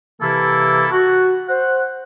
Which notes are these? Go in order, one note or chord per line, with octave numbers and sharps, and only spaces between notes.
C3 E3 A#3 E4 A4
F#4
C5 F#5